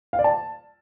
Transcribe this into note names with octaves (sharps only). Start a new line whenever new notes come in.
F5
D5
A5